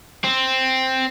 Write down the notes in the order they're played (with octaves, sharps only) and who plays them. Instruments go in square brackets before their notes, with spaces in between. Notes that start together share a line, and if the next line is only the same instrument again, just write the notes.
[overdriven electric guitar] C4